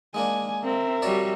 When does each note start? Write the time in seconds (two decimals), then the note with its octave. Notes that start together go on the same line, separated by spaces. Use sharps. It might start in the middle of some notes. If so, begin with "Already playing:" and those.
0.14 G#3 A#3 D4 G#5
0.64 C4 A#4 E5
1.02 G3 F#4 C#5 D5 A5